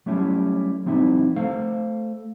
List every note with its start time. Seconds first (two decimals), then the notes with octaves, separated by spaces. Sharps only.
0.06 F#3 G3 A3 C#4 E4 G4
0.86 F3 G3 C4 D#4 E4
1.36 A3 A4 C5 F5